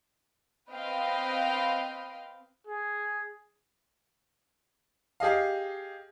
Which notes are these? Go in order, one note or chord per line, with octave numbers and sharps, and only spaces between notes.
C4 B4 D#5 F5 G5
G#4
G4 G#4 D#5 F5